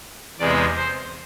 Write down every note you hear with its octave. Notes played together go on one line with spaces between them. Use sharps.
E2 C3 G#3 B3 D5
C5